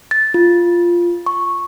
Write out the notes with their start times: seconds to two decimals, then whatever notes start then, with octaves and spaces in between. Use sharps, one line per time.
0.11 A6
0.34 F4
1.26 C#6